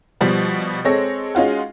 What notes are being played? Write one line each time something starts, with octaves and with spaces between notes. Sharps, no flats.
B2 F3 G3 B3
G#3 C4 A4 C#5 A#6
G#3 C#4 D#4 F4 F#4